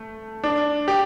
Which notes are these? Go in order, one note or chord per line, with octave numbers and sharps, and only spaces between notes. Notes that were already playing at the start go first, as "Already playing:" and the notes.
Already playing: A3
D4
G4